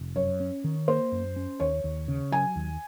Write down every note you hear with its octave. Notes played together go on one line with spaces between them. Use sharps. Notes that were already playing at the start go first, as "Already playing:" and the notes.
Already playing: F1
F#2 C#5
C#4
D#3
A#3 C5
F#2
C#4
D#2 C#5
D#2
C#3
F#3 G#5
D#2